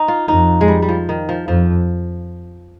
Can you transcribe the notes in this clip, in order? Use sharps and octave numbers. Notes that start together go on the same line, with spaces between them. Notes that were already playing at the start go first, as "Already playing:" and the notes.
Already playing: D#4
F4
F2 D#4
G#3
G3
G3
F3
D#3
F3
F2 F3